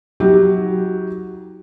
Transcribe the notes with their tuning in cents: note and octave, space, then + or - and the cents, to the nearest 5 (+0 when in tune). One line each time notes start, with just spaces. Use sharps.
F#3 -5 D#4 +40 G4 +0